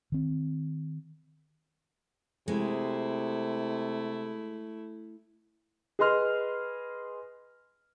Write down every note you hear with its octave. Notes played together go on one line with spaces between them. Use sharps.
D#3 C4
C3 G#3 A3 E4
G#4 B4 D#5 C6 F6